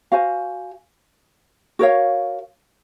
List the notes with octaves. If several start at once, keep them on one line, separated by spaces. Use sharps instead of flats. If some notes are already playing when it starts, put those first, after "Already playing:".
F#4 C5 F5 G#5
F#4 A#4 C#5 F5